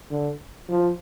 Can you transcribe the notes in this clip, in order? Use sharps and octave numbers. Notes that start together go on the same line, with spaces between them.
D3
F3